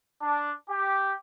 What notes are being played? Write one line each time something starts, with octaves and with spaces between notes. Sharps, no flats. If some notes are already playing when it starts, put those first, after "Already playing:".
D4
G4